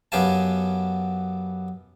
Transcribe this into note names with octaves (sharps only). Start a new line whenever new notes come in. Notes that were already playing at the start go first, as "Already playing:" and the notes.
F#2 B3 G4 F5 G#5 A5